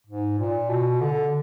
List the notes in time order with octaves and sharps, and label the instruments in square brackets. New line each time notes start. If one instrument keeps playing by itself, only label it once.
[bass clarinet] G#2
A#2
B2
D3